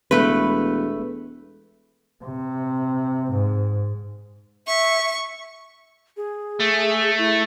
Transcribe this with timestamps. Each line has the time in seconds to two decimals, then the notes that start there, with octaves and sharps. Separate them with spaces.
0.11 E1 A3 B4
2.24 C3
3.31 G#2
4.67 E5 C#6
6.17 G#4
6.60 A3
7.18 E4